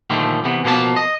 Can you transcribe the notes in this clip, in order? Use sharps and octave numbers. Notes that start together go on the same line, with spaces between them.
A#2 D3 D#3 F3 G3 A3
C3 E3 B3
B2 F3 A#3 D#5 A5
D#5